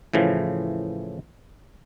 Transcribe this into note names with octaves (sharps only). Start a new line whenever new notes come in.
A2 C#3 E3 F3